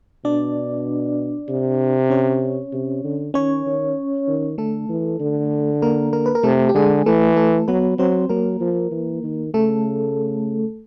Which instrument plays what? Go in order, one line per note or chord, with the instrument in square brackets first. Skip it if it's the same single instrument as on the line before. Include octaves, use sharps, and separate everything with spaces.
[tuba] B2 [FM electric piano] D4 D5
[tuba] C3
[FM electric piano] C#4 C#5
[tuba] C3
D3
[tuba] D#3 [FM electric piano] C#4 C#5
[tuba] D#3
D#3
[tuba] D3 [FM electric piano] A3 A4
[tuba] E3
D3
[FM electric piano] A#3 A#4
A#3 A#4
B4
A#4
[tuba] C3 [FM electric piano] A3 A4
[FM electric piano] G4
[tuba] D3 [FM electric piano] G#3 G#4
[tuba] E3 [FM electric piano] A3 A4
[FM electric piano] A3 A4
[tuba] F#3 [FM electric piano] B3 B4
[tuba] F#3 [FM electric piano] C4 C5
[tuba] F#3 [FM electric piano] A#3 A#4
[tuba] F3
E3
D#3
[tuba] C#3 [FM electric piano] A3 A4